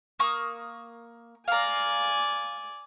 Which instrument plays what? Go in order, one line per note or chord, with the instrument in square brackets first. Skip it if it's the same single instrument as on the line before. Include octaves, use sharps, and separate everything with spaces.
[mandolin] A#3 C#6 D#6
[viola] D5 G#5 [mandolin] F5 A#5